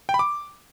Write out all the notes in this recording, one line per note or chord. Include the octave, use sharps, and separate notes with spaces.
G5
B5
D6